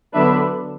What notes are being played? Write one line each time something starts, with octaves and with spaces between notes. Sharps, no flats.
D3 F#3 B3 D4 B4 E5